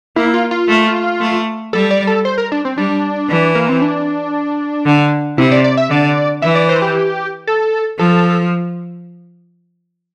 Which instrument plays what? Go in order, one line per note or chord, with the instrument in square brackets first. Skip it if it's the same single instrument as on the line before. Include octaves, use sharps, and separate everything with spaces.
[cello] A#3 [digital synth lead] E4
[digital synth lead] F4
F4
[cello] A3
A3
[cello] G3 [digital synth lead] A4
[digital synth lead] D5
A4
C5
A#4
D4
C4
[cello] G3 [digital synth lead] D4
[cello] E3
[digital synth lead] A#3
C4
D4
[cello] D3
[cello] C3 [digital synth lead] E4
[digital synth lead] D5
D5
E5
[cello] D3 [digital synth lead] D5
[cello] E3 [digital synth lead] E5
[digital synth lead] D5
C5
G4
A4
[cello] F3 [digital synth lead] A4